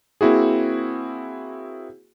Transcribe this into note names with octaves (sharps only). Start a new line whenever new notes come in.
A#3 C4 E4 F#4 G#4